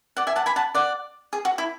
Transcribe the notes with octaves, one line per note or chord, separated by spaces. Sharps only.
D5 F#5
E5 G#5
F#5 A5
G#5 B5
F#5 A5
D5 F#5
G#4
F#4
E4